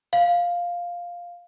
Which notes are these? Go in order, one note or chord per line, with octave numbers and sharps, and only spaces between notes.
F5